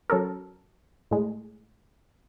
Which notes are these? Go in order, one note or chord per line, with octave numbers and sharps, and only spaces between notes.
F#3 C#4 A4 A#4
A2 G#3